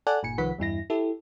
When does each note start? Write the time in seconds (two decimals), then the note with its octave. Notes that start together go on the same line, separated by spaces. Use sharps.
0.07 A4 D5 F#5 G#5 A5 F#6
0.23 G1 A#2 G#5 C#7
0.38 C2 D#3 F3 B4 F#5 B6
0.59 E2 G2 E4 A#6
0.90 E4 G4 A4